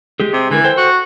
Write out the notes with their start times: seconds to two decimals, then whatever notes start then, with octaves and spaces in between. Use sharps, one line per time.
0.20 G#3 G4 G#4
0.33 C3
0.51 D3 E3 A#4
0.64 A4 C5 G5
0.77 F#4